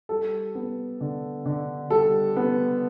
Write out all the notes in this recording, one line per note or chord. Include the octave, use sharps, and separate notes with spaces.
G3 A4
B3
D3
D3
G3 A4
B3